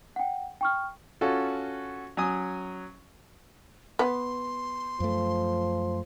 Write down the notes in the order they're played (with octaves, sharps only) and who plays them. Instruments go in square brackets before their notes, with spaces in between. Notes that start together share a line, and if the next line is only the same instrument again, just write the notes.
[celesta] F#5 G5
G5 C#6 F6
[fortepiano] C#4 F4 F#4 A4
F#3 C#4 G#5 D#6
[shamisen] B3 [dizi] C6
[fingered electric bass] F#2 A3 [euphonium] F3